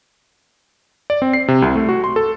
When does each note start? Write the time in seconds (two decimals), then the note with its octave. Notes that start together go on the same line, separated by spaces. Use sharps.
1.10 D5
1.22 C4
1.33 C7
1.48 C3
1.62 C2
1.76 A3
1.89 F#4
2.04 C6
2.16 A4